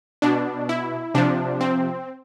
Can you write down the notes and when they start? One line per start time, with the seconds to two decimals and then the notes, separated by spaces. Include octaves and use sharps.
0.22 B2 D4
0.69 E4
1.14 C3 F3 D4
1.61 C4